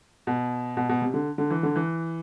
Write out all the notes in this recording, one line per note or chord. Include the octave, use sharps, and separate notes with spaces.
B2
B2
B2
C3
D3
D3
E3
D3
E3